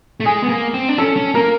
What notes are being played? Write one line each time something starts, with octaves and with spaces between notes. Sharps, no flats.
A3
G#3 G#4
B3
A#3
C4
D4
C#4 A4
C#4
A#3 A#4